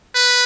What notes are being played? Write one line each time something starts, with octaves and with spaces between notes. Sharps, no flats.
B4